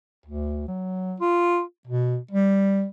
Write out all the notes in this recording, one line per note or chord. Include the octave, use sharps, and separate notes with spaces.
D2
F#3
F4
B2
G3